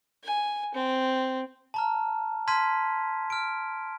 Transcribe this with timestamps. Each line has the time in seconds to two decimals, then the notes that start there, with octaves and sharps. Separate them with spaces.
0.24 G#5
0.74 C4
1.74 A5 A#5 F6
2.47 A5 C6 F6 G#6 B6 D#7
3.30 F6 D7